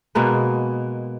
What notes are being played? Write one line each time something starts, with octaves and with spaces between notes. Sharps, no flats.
B2 G#3 A#3 B4